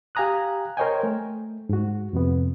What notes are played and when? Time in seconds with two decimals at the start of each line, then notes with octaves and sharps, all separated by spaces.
0.15 G4 F5 G#5 A#5 D#6 F#6
0.77 A#4 C5 C#5 D#5 G5 G#5
1.03 A3
1.69 G#2 F#4
2.13 F2 C3 B3